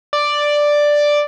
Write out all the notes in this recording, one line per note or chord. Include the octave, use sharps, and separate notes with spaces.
D5